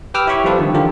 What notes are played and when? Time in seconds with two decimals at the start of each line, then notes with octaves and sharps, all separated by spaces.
0.14 G4 B4 G5 D6 E6 F6
0.27 E4 G4 C#5 B5 C#6
0.44 F3 G3 C4 F4 A4 B4
0.58 D3 D#3 F3
0.74 D3 E3 F4 G4 A#4